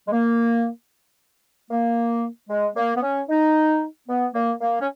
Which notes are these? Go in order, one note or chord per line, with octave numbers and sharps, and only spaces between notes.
G#3
A#3
A#3
G#3
A#3
B3
C#4
D#4
B3
A#3
A#3
C#4